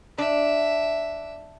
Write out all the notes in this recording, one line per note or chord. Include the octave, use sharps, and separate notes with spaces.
D4 E5